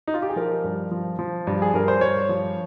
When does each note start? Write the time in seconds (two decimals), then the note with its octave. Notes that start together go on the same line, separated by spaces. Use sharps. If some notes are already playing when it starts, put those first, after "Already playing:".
0.08 D#4
0.14 F4
0.22 G4
0.29 G#4
0.36 F3 A#4
0.64 G2
0.91 F3
1.19 F3
1.47 G2
1.62 G#4
1.74 G2 A#4
1.88 C5
2.01 G2 C#5
2.29 F3